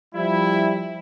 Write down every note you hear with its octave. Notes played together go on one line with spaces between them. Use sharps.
F3 G3 E4